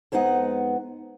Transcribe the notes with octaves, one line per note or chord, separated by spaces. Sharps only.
F2 G#3 B3 D#4 F#5